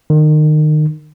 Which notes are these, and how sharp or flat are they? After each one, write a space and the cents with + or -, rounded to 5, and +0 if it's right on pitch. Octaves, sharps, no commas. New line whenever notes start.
D#3 -30